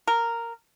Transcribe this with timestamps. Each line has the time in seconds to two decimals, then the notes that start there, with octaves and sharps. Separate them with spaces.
0.07 A#4